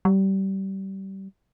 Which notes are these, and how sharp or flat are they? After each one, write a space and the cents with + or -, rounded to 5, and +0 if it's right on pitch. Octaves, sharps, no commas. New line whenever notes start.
G3 -25